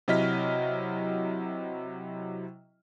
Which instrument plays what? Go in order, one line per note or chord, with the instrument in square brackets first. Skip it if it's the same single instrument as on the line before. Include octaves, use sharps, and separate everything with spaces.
[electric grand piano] C3 F#3 E4 D#5 F6 B6